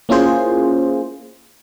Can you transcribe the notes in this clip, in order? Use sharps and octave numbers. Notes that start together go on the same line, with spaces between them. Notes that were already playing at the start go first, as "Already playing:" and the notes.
A#3 C#4 E4 F4 G#4 C5